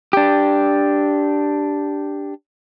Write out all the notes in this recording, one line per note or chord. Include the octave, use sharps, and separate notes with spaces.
D4 G4